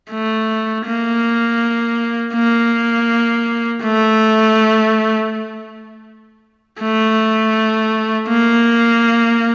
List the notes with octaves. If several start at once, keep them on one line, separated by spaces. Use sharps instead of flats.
A3
A#3
A#3
A3
A3
A#3